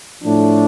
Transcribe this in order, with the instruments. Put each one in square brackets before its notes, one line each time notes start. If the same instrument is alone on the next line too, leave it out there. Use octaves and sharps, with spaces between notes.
[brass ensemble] A2 F3 A3 D4